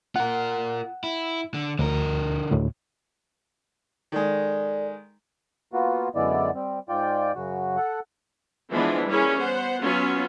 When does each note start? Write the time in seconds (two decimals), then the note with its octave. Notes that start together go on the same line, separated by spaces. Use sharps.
0.16 F4 A#4 F#5
1.04 E4
1.54 D3
1.79 D2 D3 A#4
2.51 D2 A2
4.12 D#3 G#3 A4 D5
5.73 A#3 B3 F4 F#4
6.15 F#2 D3 G#3 B3 E4 D5
6.54 G3 C4
6.89 G#2 F4 D5 G5
7.35 F#2 C#3 F#4
7.77 A4 F#5
8.71 E3 F3 G#3 B3 D4
9.06 G3 A#3 C#4 E4 G#4
9.36 B3 C5 F#5
9.81 F#3 B3 C#4 F4